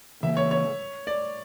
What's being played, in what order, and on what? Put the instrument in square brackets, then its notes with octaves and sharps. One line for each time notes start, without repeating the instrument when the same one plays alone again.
[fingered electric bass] C#3 E3 A#3 [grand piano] E5
[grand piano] C#5
C#5
D5